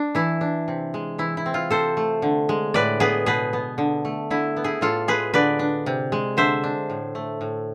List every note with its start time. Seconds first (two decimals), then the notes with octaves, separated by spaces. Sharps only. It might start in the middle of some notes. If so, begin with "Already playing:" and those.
Already playing: D4
0.15 E3 E4
0.41 D4
0.68 C3
0.94 G#3
1.18 E3 E4
1.37 E4
1.46 C4
1.54 F4
1.70 C3 A4 C5
1.97 A3
2.22 D3
2.49 G#3
2.74 A2 B4 D5
3.00 B3 G#4 B4
3.26 B2 G#4 B4
3.53 B3
3.78 D3
4.05 A3
4.30 D3 E4
4.57 B3
4.64 E4 G#4
4.81 A2 F4 A4
5.08 G#3 G#4 B4
5.34 D3 B4 D5
5.59 D4
5.86 C3
6.12 G#3
6.37 D3 C5 E5
6.64 D4
6.90 A2
7.15 A3
7.41 A2